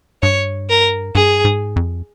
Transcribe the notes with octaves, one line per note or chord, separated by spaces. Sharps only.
G2 C#5
A#4
G2 G#4
G#2
F2